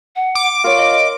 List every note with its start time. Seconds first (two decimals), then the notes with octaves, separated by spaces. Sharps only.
0.16 F#5
0.35 D6
0.64 F4 A#4 C#5
0.77 D#5